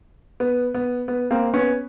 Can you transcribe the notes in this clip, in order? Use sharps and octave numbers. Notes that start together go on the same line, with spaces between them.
B3
B3
B3
A#3 C4
B3 C#4